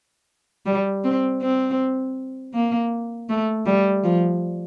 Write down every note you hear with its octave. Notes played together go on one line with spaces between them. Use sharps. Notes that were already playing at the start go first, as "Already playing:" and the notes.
G3
C4
C4
A#3
A3
G3
F3